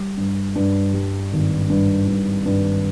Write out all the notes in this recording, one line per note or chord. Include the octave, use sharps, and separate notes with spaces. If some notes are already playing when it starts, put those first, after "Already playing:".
Already playing: G3
G2
G2
G3
G#1
G2
G2
G2